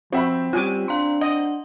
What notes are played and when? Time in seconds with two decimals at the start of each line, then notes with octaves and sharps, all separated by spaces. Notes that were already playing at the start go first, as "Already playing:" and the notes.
0.13 F3 C4 F#4 E5 B5
0.53 G3 C#4 F4 G#5 D6
0.88 D4 F5 A#5 C6
1.21 D#5 F#5